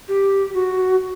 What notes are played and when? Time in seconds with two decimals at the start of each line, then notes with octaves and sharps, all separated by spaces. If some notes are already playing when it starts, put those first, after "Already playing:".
0.09 G4
0.54 F#4